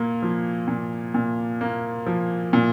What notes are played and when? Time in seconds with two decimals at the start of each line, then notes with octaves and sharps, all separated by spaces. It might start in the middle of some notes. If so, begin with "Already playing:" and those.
Already playing: A#2 A#3
0.22 F3
0.68 A#2
1.14 A#2
1.61 A#3
2.07 F3
2.53 A#2